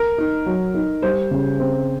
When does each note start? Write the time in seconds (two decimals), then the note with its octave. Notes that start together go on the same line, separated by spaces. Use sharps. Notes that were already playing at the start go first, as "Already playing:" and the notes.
Already playing: A#4
0.18 D#4
0.46 F#3
0.74 D#4
1.02 G3 C5
1.31 C#3
1.60 C4